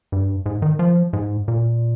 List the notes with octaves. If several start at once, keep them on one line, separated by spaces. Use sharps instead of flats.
G2
G#2
D#3
F3
G#2
A#2